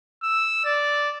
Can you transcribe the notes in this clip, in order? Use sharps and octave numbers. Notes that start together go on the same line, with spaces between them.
E6
D5